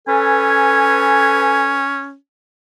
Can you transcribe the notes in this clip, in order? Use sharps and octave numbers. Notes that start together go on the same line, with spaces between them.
C#4 A4 B4 G#5